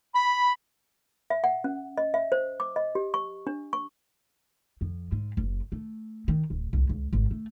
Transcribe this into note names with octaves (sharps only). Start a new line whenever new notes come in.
B5
E5
F#5
C#4
D#5
E5
C5
D6
D#5
G4
C#6
D4
C#6
F2
G#2
F#1
A3
D#3
D1
C2
C#2
G#1
A3